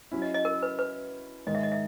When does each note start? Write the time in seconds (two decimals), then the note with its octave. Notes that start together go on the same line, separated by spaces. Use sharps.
0.12 F#3 C#4 E4
0.22 D#5
0.34 D#5
0.45 A#4
0.63 B4
0.79 B4
1.47 G#2 D#3 G#3 D#5
1.55 E5
1.63 D#5
1.72 E5